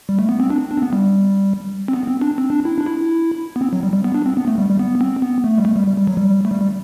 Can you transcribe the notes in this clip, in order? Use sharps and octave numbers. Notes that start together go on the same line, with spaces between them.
G3
A3
B3
C4
D4
D4
C4
B3
G3
C4
B3
C4
D4
C4
D4
E4
D4
E4
B3
C4
F#3
G3
G3
B3
D4
C4
B3
A3
G3
G3
B3
C4
B3
A3
G3
A3
G3
G3
G3
F#3
G3
A3
G3
G3